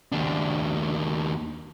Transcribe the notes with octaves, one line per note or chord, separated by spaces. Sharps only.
D#2 D4